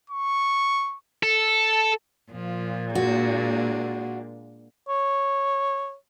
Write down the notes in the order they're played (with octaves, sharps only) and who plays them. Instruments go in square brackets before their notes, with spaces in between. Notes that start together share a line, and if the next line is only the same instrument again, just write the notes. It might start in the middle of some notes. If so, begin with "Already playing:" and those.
[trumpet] C#6
[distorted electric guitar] A4
[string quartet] A#2 [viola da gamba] F3
[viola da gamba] G#3 A#3 D4 [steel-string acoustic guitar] F#4
[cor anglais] C#5